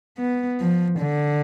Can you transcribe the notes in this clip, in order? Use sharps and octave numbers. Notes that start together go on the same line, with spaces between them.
B3
F3
D3